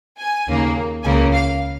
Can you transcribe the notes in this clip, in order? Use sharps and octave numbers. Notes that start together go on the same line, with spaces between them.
G#5
D#2 C#3 A#3
C#2 C#3 A#3 G#5
F5